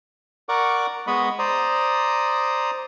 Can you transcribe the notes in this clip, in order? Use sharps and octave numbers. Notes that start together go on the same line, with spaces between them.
A#4 D5 F#5 C#6 D6
G#3 B3 D#5 B5 C#6
C5 D5 A#5 D#6